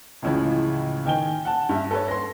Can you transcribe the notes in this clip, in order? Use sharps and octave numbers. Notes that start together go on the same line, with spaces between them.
C#2 A2 C#3 E3 F3
D#3 G5 G#5 G7
F#5 A5
G2 E5
A4 B4 C#5
C6 A#6